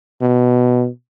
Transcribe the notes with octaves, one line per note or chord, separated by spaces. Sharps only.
B2